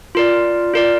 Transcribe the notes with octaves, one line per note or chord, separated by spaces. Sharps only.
F4 A#4 D5
F4 A#4 D5